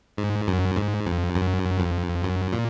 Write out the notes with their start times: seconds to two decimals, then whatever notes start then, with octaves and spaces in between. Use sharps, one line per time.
0.17 G#2
0.47 F#2
0.76 G#2
1.06 F2
1.35 F#2
1.79 F2
2.24 F#2
2.53 A#2